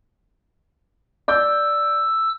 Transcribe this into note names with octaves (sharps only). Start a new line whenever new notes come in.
D5 D6 E6 G6